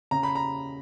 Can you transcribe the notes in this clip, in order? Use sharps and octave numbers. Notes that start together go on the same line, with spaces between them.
C#3 A#5
B5
A#5